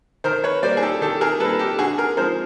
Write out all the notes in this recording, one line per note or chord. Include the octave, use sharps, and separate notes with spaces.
D#3 A#4 C5
B4 C#5
G3 A#3 C5 D5
G#4
G4 A4
D#3 G4 A4
G#4 A#4
G3 A#3 A4 B4
G4 A4
D3 F#4 G#4
G#4 A#4
F3 G#3 A#4 C5